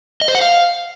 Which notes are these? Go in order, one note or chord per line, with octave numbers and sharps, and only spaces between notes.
D#5
C5
F#5
F5